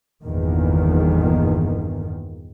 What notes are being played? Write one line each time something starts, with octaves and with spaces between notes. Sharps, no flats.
G1 E2 A#2 D#3